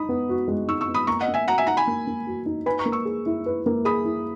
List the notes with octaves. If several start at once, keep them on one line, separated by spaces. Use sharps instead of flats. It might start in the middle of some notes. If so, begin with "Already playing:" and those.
Already playing: D#4 B5 D#6
B3
F#4
G#3
D#4 C#6 E6
C#6 E6
B3
B5 D#6
A#3 A#5 C#6
D#5 F#5
A#3
E5 G#5
F#4 F#5 A#5
E5 G#5
D#4 F#5 A#5
G#5 B5
A#3
A#3
F#4
D#4
B4 G#5 B5
A#5 C#6
A#3
C#6 E6
G#4
E4
B4
A#3
G#4 B5 D#6
E4